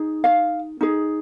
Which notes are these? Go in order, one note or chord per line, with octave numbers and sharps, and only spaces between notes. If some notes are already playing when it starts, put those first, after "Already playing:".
Already playing: D#4 G#4
F5
D#4 G#4